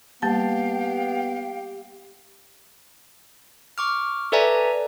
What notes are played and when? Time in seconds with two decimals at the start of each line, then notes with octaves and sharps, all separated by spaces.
0.22 G3 A#3 B3 G4 F5 G5 A5
3.78 C#6 D6 F6
4.32 A4 B4 D5 E5 G#5 A#5